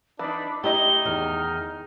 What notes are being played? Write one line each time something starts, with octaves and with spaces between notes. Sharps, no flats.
E3 D4 D#4 B5
A3 D#4 E4 G4 D#5 G7
E2 D#3 F6